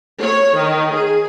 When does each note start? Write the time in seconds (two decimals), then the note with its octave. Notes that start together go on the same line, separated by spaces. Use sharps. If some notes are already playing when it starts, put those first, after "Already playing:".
0.20 C#5
0.55 D#3
0.94 G#4